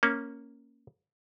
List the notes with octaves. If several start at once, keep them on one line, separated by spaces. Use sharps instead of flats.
A#3 C#4